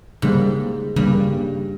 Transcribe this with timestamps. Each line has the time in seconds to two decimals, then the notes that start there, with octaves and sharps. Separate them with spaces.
0.22 G#2 C#3 G3 A#3
0.96 G2 C#3 G3 A#3